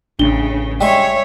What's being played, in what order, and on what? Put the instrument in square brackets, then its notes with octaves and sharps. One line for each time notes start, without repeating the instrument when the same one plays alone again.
[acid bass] A1 [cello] C#3 [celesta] D4 G7
[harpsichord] G3 G#3 C#6 [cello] C#5 E5 [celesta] G5